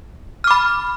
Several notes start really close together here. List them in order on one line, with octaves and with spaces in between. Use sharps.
F6 D6 B5